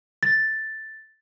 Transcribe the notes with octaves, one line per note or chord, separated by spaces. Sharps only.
A6